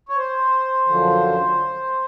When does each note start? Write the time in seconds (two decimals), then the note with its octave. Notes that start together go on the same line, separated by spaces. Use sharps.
0.09 C#5
0.17 C5
0.88 F#2 D3 F3